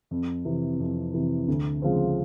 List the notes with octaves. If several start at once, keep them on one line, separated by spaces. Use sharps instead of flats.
F2
C3 E3
F2
C3 E3
D2
C#3 F3 G#3 C4